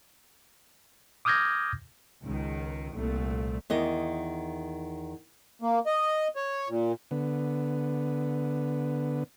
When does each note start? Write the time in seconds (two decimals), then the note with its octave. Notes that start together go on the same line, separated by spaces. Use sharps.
1.25 D6 D#6 F6 G6 G#6 A#6
2.23 C#2 D#3
2.94 C2 A#2 A3
3.70 E2 D#3 D#5
5.62 A#3
5.86 D#5
6.36 C#5
6.69 A#2
7.11 D3 B3